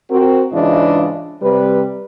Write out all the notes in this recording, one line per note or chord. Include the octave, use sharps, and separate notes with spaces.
C4 F#4 A#4
G#2 C#3 E3 D4 F4 D#5
C3 G3 B4